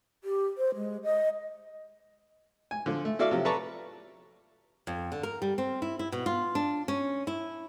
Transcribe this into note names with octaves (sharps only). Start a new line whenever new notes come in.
G4
C5
G#3
D#5
G#5
D3 F3
A3
E4 F#4 A4 D5 E5 F5
C3 F3 F#3
A4 B4 D5 A5 A#5 C#6
F2
D3
A#4
G3
C4
E4
E4
B2
F4
D4
C#4
E4